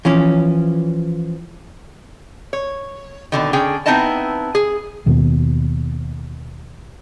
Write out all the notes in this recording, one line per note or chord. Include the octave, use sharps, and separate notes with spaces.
E3 F3 C#4
C#5
B2 D3 D#3
D3 C#4 G#4 G5
B3 C4 D#4 E4 D#5 A5
G#4
D#2 B2